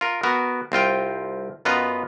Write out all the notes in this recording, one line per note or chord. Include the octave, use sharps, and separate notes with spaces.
F4 A#4
B3 F#4 A#4
C2 C4 F4 G5
F#2 B3 F4 B4 D#5 A#5